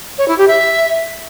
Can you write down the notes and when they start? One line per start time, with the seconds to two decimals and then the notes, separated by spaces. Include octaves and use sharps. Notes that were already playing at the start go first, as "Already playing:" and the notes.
0.18 C#5
0.28 E4
0.38 G4
0.48 E5